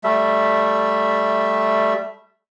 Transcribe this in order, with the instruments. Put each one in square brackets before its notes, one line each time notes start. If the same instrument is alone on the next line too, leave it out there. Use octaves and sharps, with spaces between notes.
[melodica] G3 A3 E5